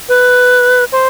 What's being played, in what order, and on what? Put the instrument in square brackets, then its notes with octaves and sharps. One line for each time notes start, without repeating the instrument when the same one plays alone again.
[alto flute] B4
C5